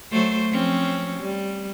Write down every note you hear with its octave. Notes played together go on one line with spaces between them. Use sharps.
F#3 A3 C5
F3 C4 C#4
G3